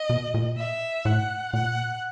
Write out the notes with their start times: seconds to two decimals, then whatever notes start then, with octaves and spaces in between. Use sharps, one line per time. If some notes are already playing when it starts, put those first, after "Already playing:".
Already playing: D#5
0.10 B2
0.34 A#2
0.57 E5
1.05 A2 F#5
1.53 A#2 F#5